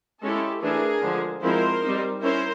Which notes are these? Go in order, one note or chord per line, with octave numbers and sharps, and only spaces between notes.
G#3 C#4 E4 G4 A4
E3 A3 D4 G#4 A#4
D3 F3 G#3
F3 G#3 C4 E4 A#4 C5
G3 C4 D#4
C#4 E4 A#4 C5